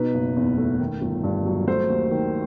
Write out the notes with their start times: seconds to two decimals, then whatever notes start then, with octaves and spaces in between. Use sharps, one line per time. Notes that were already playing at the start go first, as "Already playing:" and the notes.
Already playing: B2 D#4 B4
0.14 F#1
0.37 E2
0.57 A3
0.79 D#3
1.01 G1
1.24 G2
1.45 F#3
1.67 A3 C5
1.89 D#2
2.11 D#3